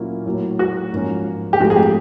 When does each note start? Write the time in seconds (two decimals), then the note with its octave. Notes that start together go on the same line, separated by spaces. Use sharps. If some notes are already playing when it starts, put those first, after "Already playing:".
Already playing: A#2 F#3 A#3 C#4 E4
0.26 A2 F#3 A#3
0.59 F#4
0.93 G#2 F3 A#3 C#4
1.53 G4
1.59 G#2 F3 A3 C4 D#4 F#4
1.70 G#4
1.76 G4